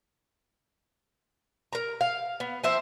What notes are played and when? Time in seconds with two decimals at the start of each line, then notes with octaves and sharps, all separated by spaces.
1.73 A#4 A#5
2.01 F5
2.40 B3
2.63 F3 C4 C5 E5